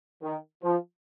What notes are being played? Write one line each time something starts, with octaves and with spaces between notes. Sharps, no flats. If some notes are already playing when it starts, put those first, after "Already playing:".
D#3
F3